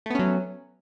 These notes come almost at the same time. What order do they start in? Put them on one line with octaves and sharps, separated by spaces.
A3 B3 C#4 F#3